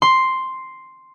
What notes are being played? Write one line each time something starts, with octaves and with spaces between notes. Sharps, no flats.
C6